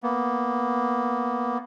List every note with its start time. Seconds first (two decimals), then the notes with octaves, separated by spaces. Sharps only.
0.03 A#3 B3